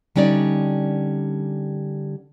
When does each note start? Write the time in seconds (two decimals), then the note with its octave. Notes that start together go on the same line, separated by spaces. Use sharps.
0.16 D3 G3 C#4 D#4 D5